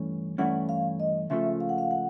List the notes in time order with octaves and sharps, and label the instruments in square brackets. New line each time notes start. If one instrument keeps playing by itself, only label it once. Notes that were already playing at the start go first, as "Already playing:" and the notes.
Already playing: [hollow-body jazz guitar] G2 E3 A3 C#4
[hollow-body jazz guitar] G2 E3 A3 C#4 E4 [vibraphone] F#5
[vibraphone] F5
D#5
[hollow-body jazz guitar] C#2 C#3 F3 A3 [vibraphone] E5
[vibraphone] F5
F#5
F5
F#5